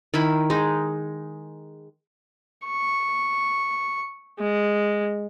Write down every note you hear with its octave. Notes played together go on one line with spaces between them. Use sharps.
D#3 E4 B5
G#3 D#4
C#6
G#3